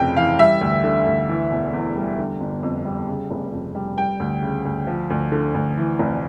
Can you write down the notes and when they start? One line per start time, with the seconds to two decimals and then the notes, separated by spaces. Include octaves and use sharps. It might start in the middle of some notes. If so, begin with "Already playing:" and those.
Already playing: F1 F2 C#3 G5
0.16 E3 F5
0.38 G3 E5
0.61 D2
0.84 D3
1.06 D2
1.29 E3
1.51 E1
1.73 E2
1.95 G3
2.18 D3
2.41 G1
2.63 F2
2.85 G3
3.08 C#3
3.31 F1
3.52 F2
3.75 G3
3.97 G3 G5
4.20 D2
4.42 C#3
4.65 D2
4.87 F3
5.10 D2
5.32 D3
5.54 D2
5.77 E3
5.99 F1